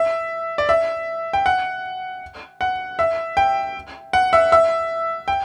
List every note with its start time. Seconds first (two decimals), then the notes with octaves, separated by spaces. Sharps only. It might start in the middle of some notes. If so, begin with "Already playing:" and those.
Already playing: E5
0.58 D5
0.69 E5
1.33 G5
1.46 F#5
2.61 F#5
2.99 E5
3.37 G5
4.13 F#5
4.33 E5
4.52 E5
5.28 G5